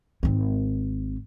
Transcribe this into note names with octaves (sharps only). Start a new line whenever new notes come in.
G#1 C4